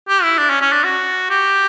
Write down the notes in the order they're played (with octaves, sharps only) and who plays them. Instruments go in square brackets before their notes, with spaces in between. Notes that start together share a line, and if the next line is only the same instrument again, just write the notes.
[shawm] G4
E4
D4
C#4
C#4
D4
F#4
G4